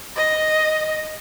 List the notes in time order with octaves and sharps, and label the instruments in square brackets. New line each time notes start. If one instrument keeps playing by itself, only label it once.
[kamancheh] D#5